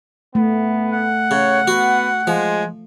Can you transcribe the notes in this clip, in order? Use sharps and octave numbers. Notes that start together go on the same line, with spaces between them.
A3 B3
F#5
C#3 C#5
B3 F#4
F3 G#3